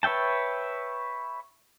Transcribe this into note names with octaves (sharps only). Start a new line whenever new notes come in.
B4 C#5 E5 G5 A5